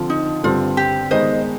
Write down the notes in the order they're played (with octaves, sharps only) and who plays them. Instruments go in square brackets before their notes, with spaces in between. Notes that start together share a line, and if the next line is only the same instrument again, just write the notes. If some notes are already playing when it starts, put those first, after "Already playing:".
Already playing: [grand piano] D3 F3 C4 F4
[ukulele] D#4
[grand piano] G2 D3 G3 C4 [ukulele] F4
[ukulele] G4
[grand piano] D#3 G#3 B3 D#4 [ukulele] C5 D#5